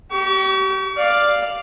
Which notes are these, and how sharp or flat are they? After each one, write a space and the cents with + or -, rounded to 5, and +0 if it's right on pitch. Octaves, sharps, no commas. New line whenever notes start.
G4 -30 C#6 +40
D5 +0 F5 +0